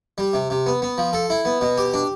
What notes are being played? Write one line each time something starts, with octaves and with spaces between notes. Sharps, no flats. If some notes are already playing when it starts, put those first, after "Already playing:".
G3
C3
C3
B3
B3
F3
A4
E4
B3
B2
G4
D4